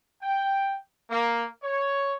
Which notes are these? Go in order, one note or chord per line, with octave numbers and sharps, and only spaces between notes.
G5
A#3
C#5